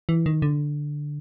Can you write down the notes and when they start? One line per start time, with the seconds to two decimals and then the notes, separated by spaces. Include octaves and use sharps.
0.09 E3
0.26 D#3
0.42 D3